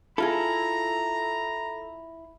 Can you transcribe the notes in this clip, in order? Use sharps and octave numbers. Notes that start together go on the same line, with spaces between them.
E4 F4 G#4 A4 A#5